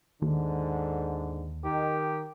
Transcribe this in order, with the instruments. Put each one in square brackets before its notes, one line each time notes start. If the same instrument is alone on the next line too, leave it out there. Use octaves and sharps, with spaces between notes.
[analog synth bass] D#2 [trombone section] G#2 D3
[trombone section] D#3 [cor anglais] G4